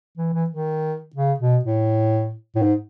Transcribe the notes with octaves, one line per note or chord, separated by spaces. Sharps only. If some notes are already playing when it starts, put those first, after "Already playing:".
E3
E3
D#3
C#3
B2
A2
A2
G#2